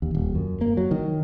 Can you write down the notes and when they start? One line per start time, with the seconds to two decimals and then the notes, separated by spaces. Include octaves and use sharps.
0.02 D#2
0.15 D#1
0.35 F#2
0.61 A#3
0.77 F#3
0.91 D#3